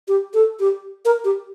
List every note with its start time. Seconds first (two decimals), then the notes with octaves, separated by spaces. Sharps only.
0.08 G4
0.34 A4
0.60 G4
1.05 A#4
1.25 G4